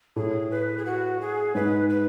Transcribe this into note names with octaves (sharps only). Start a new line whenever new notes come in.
A2 A3 G#4
B4
G#4
F#4
G#4
G#2 G#3 B4
B4